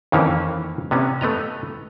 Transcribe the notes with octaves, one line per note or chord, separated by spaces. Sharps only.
F2 D#3 E3 A#3 C#4
C3 B3 C#4
A3 B3 D#5 A#5